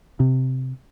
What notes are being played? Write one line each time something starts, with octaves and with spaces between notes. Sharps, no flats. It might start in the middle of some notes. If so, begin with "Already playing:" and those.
C3